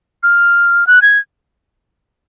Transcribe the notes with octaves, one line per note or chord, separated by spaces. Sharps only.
F6
F#6
G#6